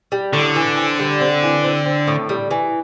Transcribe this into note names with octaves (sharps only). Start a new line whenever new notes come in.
G3
A2 D3
E3
C4
G3
C4
E3
C4
C4
A2
G3
E3